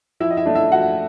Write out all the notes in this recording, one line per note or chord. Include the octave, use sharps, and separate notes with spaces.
F3 E4 E5
D#5
E4 E5
A3 D4
E4 E5
F3 F#4 F#5